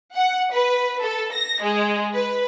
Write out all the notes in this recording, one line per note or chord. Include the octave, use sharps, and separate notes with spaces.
F#5
B4
A4
A#6
G#3
B4